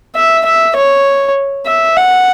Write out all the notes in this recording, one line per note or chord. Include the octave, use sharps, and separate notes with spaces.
E5
E5
C#5
E5
F#5